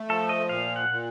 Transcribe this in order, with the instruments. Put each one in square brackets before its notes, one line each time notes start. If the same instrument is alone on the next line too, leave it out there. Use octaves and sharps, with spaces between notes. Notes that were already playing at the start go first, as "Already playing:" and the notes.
Already playing: [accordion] A3
[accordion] F3 [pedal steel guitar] A4
[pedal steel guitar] D#5
[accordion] A#2 [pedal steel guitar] F5
[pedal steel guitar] F#5
[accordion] A#2